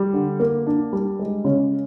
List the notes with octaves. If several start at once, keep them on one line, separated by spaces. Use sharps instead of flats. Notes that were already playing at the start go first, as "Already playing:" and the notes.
Already playing: G3
D3
A#3
D4
G3
G#3
C#3